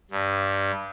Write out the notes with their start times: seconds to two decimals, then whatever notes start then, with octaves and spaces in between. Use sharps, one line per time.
0.11 G2